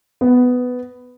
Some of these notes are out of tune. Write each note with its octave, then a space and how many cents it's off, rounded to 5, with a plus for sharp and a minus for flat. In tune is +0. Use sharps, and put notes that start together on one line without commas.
B3 +10